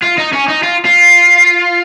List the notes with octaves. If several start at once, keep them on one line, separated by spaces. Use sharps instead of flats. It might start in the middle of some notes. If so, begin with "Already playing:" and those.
F4
D#4
C#4
D#4
F4
F4